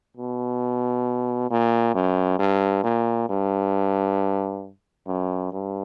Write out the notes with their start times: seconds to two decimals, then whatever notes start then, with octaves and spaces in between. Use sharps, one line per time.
0.17 B2
1.51 A#2
1.95 F#2
2.39 G2
2.84 A#2
3.29 G2
5.07 F#2
5.53 G2